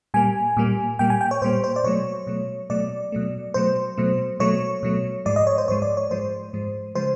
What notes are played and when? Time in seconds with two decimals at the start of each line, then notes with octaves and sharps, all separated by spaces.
0.14 A#2 G3 A#3 G#5
0.57 A#2 G3 A#3
0.99 A#2 G3 A#3 G5
1.10 G#5
1.21 G5
1.31 C#5
1.42 A#2 G3 A#3 C5
1.64 C5
1.76 D5
1.84 B2 F#3 A3 C#5
2.27 B2 F#3 A3
2.70 B2 F#3 A3 D5
3.12 B2 F#3 A3
3.54 B2 F#3 A3 C5
3.97 B2 F#3 A3
4.40 B2 F#3 A3 C#5
4.83 B2 F#3 A3
5.25 G#2 F3 G#3 D5
5.36 D#5
5.47 C#5
5.58 C5
5.68 G#2 F3 G#3 C#5
5.82 D5
5.97 C#5
6.10 G#2 F3 G#3 C5
6.53 G#2 F3 G#3
6.95 C#3 F3 G#3 C5